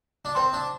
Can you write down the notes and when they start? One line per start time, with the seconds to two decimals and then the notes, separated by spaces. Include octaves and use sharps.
0.25 D4
0.35 C4 C5 G5 C6
0.53 D4